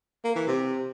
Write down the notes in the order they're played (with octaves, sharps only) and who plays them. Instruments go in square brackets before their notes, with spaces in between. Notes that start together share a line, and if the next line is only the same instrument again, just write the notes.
[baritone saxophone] A#3
E3
C3